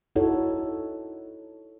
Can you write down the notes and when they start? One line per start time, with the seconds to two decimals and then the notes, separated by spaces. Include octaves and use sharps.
0.16 D#4 E4 F#4 A4 C#5